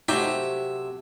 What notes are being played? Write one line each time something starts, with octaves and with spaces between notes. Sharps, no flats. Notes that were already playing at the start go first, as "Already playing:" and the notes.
C3 F#3 A3 D#4 G4 E5